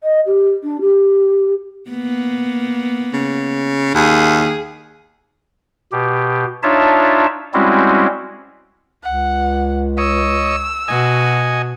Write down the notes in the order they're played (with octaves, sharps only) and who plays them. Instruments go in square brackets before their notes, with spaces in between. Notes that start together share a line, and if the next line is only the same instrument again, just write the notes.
[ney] D#5
G4
D4
G4
[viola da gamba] A#3 B3
[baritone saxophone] C#3
[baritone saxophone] D#2 [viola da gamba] G#4
[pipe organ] B2 G4
D4 D#4 F4 C#5 E5 A5
G3 G#3 C4 C#4 E4 F#4
[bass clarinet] C#2 [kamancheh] F#5
[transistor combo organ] C#5 D#5 [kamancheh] E6
[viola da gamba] B2 F#4 [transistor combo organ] D#5 G#5